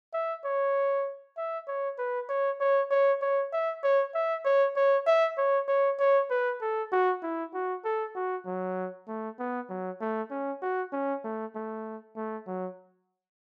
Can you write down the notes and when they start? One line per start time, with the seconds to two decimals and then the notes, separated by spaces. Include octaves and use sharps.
0.14 E5
0.45 C#5
1.37 E5
1.68 C#5
1.99 B4
2.29 C#5
2.61 C#5
2.91 C#5
3.22 C#5
3.53 E5
3.83 C#5
4.15 E5
4.45 C#5
4.76 C#5
5.07 E5
5.38 C#5
5.68 C#5
6.00 C#5
6.30 B4
6.62 A4
6.92 F#4
7.23 E4
7.54 F#4
7.85 A4
8.15 F#4
8.46 F#3
9.08 A3
9.39 B3
9.69 F#3
10.01 A3
10.31 C#4
10.62 F#4
10.93 C#4
11.24 A3
11.55 A3
12.16 A3
12.47 F#3